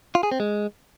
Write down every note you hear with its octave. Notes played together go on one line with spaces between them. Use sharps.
F4
G#4
C4
G#3